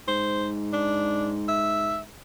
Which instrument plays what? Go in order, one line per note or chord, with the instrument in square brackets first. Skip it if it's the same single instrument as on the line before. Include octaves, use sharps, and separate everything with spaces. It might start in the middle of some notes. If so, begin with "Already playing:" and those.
[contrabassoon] G#2 [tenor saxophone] C5
[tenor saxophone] D4
E5